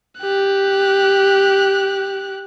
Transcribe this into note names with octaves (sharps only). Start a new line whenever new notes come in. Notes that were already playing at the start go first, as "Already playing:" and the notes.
G4 F#6